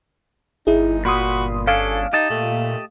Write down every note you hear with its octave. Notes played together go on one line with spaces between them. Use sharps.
G1 D#4 E4 G#4
A#2 F#4 B5 C6 D#6
C#4 D4 G#4 A4 F5
D#4 G4 D#5 A5
A#2 A3